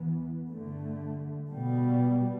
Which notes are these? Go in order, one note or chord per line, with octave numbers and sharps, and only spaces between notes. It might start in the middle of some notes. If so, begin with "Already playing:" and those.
Already playing: E2 E3 B3
G2 D3 A3
B2 G3 B3